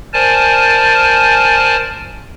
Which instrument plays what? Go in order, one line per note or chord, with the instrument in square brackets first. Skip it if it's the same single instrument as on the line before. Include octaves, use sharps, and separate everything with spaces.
[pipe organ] A#4 C5 D5 G#5 A5